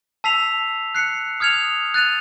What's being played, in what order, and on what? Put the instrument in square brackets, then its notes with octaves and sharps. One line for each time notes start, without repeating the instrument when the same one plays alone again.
[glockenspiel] A5 E6 B6 C7 F7
F#6 C7 C#7
D#6 F6 G#6 C#7 F7
F#6 A6 D#7 F7